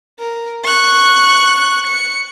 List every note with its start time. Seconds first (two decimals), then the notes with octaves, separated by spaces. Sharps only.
0.19 A#4
0.64 C#6 F#6
1.87 C#7